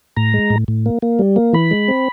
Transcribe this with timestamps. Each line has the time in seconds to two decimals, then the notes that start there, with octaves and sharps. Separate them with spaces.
0.17 A2 A#5
0.34 G#3
0.50 A2
0.68 A2
0.86 A#3
1.02 A#3
1.19 G3
1.36 A#3
1.53 E3 B5
1.71 G#3
1.88 C4